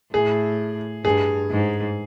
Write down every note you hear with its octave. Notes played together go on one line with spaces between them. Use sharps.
A2 G#4
G2 G#4
G#2